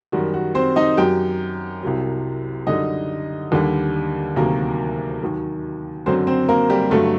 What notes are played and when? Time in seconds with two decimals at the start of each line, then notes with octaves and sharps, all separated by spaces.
0.12 F#2 D#3 G3 F#4
0.34 F#4
0.55 C4 C5
0.76 D#4 D#5
0.97 F#2 F#3 G4 G5
1.83 C2 C3 F#3
2.67 F#2 D3 G3 D#4 D#5
3.52 D#2 D3 G3
4.36 D2 C3 D#3 F#3 A#3 A#4
5.21 D#2 D#3 F#3
6.06 F#2 D3 F#3 C4 C5
6.27 C4 C5
6.49 A#3 A#4
6.70 G3 G4
6.91 G2 D3 F#3 A3 A4